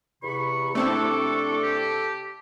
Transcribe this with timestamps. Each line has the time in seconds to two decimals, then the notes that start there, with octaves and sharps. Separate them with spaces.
0.23 E2 C3 B5 C#6
0.75 C3 A3 C4 D4 E4 A4 D6
1.63 G4